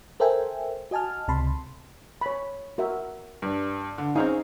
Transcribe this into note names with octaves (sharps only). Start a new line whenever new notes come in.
A4 A#4 C5 E5 G5 G#5
F#4 D#5 G#5 A5 F6
C#2 C3 A5 B5 C6
C#5 B5
F#4 A#4 E5
G2
D3
C4 C#4 D#4 G#4 F5